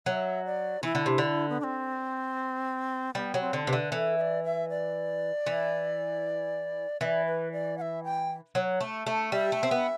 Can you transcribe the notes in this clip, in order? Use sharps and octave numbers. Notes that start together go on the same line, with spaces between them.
F#3 E5
D5
E3 E4
D3
C3
D3
B3
D4
C4
G3 B3
F#3
C4
D3
C3 B4
D3
E3 A4
E5
D5
E5
D5
E3
E3 D5 E5
B4
D5
F#5
E5
G5
F#3
A3
A3
G3 E5
A3
C4
B3